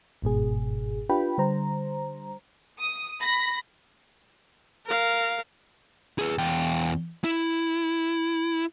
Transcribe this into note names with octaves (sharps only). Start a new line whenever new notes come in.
G1 G#2 B2 G#4
D4 F4 G4 B4 G5 B5
D3 G3 C5 A#5
D#6
B5 A#6
A#4 F5
G#4 B4
E2 G5
E4